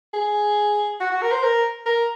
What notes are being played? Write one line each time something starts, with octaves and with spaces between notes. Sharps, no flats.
G#4
F#4
F#4
A#4
C5
A#4
A#4